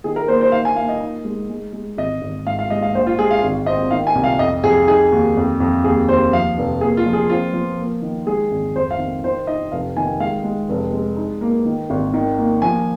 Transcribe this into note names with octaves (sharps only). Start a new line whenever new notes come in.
D#3 G#4
A#4
A#3 C5
C5
D#4 F5
G#5
A#3 F5
D#5
D#4
G#3
G#3
G#3
G#1 D#5
G#1
G#2 F5
F5
G#3 D#5
F5
A#1 C5
F4
G#3 G#4
F5
G#1
C4 D#5
D#3 F5
G#5
C2
F5
F2 D#5
F2 G#4
D#4 G#4
D#2
F2
F2
D#2 G#4
D#2 C5
F3 F5
F1
A#3 G#4
F4
F3
G#4
C4 F4
F3
A#3
D#3
G#3 G#4
G#1
F2 C5
F5
D#3
D#3 C5
D#4 D#5
F1 F5
D#3 G#5
G#3 F5
G#3
F1
G#3
D#4
A#3
D#3
G#1
D#3
A#3
F3 G#5